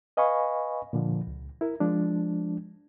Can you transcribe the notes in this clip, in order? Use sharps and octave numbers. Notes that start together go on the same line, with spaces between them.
B4 D#5 F5 G#5 B5 C#6
A#2 D3 F3
C#2
E4 A#4
F3 G#3 D4